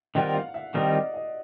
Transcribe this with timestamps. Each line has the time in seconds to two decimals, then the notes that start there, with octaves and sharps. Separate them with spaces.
0.15 D#3 G3 C4 F4 A#4 F#5
0.34 F5
0.54 E5
0.74 D#3 G3 C4 F4 A#4 D#5
0.85 D#5
0.94 D5
1.14 D#5